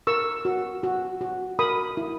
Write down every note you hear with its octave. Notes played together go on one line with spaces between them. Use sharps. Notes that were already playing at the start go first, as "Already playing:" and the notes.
A#4 C#6 E6
F#4
F#4
F#4
A#4 B5 D#6
E4